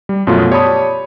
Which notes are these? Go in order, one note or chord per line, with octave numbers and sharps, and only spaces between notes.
G3
F#2 B2 F3 A3 B3 F4
G4 C#5 D5 A5 B5 D#6